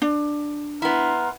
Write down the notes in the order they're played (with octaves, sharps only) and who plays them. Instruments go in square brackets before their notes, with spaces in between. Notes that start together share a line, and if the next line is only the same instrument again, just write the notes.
[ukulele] D4
[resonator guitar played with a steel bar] B3 E4 [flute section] A#5 C6 F6